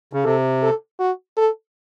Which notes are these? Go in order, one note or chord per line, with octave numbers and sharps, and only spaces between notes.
C#3
C3 A4
A4
F#4
A4